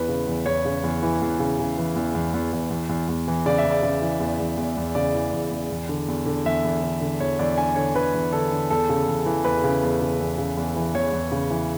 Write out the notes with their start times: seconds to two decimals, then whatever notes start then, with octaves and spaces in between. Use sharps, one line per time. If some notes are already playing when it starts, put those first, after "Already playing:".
Already playing: E2 E3 B4
0.08 C#3
0.27 E2
0.46 E2 C#5
0.65 C#3
0.83 E2
1.03 E3
1.22 E2
1.39 C#3
1.59 C#3
1.78 E3
1.96 E2
2.14 E2
2.34 E2
2.53 E2
2.70 E2
2.89 E2
3.08 E2
3.28 E3
3.46 C#3 D5
3.58 E5
3.64 E2
3.71 D5
3.83 C#3
4.02 E3
4.20 E2
4.40 E2
4.58 E2
4.77 E2
4.95 C#3 D5
5.14 E3
5.32 E2
5.51 E2
5.71 E2
5.89 D3
6.08 E2
6.26 D3
6.46 E2 E5
6.64 E2
6.83 D3
7.01 D3
7.20 E2 C#5
7.39 E2 D5
7.58 D3 G#5
7.76 D3 C#5
7.95 D3 B4
8.14 E2
8.33 D3 A4
8.52 D3
8.70 E2 A4
8.89 C#3
9.08 E2
9.26 E3
9.45 E2 B4
9.63 C#3
9.83 E2
10.02 C#3
10.19 E2
10.38 C#3
10.57 E2
10.76 E3
10.94 E2 C#5
11.13 E2
11.32 C#3
11.50 E3